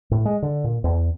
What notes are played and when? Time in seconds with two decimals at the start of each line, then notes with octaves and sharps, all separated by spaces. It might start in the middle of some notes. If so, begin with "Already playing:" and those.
0.11 A2
0.25 G#3
0.42 D3
0.64 A#2
0.84 E2